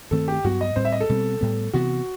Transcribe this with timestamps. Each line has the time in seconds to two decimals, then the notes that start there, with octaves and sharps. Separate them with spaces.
0.11 G2 D#3 A3 C4 A4
0.28 G4
0.44 G2 F#3 B3 F#4
0.61 D#5
0.76 A2 G3 C4 C5
0.85 E5
0.92 D#5
1.00 A4
1.09 B2 G3 C4
1.41 A2 G3 B3
1.73 C3 E3 B3 F#4